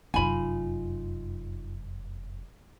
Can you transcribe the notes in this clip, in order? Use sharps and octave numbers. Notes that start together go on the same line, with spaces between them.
F1 F#2 D#4 F4 G#5 B5